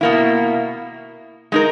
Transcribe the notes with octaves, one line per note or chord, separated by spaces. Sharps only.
B2 A#3 E4
G#3 D#4 A#4